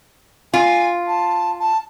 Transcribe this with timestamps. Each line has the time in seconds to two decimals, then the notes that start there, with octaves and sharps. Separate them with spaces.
0.54 F4 G#5
1.07 A5
1.60 A5